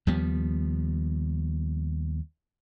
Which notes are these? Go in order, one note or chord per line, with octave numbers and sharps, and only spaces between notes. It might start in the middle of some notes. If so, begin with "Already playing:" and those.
D#2 F3 G3 B3